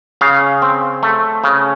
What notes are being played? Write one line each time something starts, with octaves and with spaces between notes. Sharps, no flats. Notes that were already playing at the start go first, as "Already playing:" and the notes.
C#3 F5
C4
A3
C#3